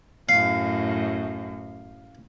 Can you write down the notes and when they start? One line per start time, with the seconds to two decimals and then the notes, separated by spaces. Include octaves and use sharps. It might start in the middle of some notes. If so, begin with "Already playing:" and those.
0.29 F#2 A2 F5